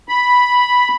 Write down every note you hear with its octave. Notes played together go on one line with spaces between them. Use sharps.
B5